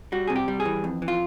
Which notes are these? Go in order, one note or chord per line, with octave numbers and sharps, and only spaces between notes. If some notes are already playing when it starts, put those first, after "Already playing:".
G3 F#4
C3 G#4
G4
G3
G#4
E3
F2
E3
F4